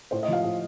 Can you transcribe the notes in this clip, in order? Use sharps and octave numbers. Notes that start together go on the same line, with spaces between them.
A2 C5
D#5
F3 F5
A2